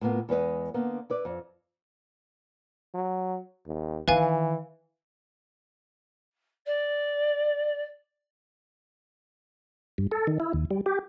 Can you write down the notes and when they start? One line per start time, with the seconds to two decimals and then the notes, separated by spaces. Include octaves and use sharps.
0.01 A2 A#3 B3 F4
0.29 E2 G#3 B4 D#5
0.74 D3 A#3 B3
1.10 E4 B4 D5
1.25 F2
2.94 F#3
3.67 D#2
4.08 D#3 E3 B4 F5 G#5
6.66 D5
9.98 G2
10.12 A4
10.27 D#3
10.40 E4
10.53 D#2
10.71 G3
10.86 G4